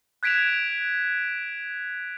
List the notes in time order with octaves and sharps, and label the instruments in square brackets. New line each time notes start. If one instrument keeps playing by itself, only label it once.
[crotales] F#6 G#6 B6 D7 E7 F7